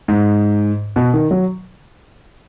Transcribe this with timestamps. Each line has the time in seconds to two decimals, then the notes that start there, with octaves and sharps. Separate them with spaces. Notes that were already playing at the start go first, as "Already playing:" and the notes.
0.08 G#2
0.96 B2
1.14 D#3
1.31 F#3